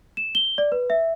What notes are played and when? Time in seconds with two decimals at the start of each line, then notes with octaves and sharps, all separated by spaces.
0.17 E7
0.35 G7
0.58 D5
0.72 B4
0.90 E5